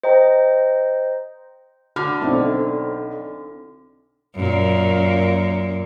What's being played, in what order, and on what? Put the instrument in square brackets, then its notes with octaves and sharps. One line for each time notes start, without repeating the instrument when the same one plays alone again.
[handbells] C5 D#5 G5 A#5
[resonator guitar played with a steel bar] D3 [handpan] F#4 [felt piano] A5 B5 F6
[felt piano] B1 [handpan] C4 D4 E4
[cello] F#2 A#2